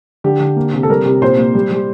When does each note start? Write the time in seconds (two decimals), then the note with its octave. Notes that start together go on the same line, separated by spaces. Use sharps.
0.24 D3 G4
0.40 D3
0.56 A#3
0.74 C3
0.83 A4
0.90 G3 A#4
1.06 C3
1.22 A#2 C5
1.38 A#3
1.55 G3
1.71 G3